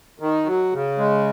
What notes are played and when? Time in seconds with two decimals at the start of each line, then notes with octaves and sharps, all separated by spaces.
0.20 D#3
0.45 F#3
0.73 C#3
0.98 G#3